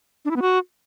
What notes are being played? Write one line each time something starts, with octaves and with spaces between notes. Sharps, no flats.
D4
E4
B3
F#4